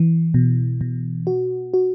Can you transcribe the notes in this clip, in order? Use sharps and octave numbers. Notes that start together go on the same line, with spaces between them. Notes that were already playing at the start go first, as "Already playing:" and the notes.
Already playing: E3
B2
B2
F#4
F#4